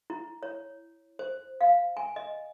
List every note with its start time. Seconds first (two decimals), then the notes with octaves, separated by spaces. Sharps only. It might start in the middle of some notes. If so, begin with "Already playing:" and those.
0.10 E4
0.43 C#5
1.19 C5
1.61 F5
1.97 G#5
2.16 D#5